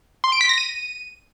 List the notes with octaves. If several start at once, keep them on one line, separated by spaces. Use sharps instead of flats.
C6
D7
B6
A#6
D#7